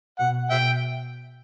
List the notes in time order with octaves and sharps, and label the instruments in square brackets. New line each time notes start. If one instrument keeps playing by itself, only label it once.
[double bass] B2 [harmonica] F#5
[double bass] B2 [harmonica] E5 G5